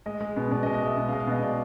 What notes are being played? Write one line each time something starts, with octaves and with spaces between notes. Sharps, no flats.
G#3 D#5
G#3
B2
B2 D5
D#5
G#3
D#5
G#3 E5
B2
F5
G#3
F5
B2 D#5
G#3 D5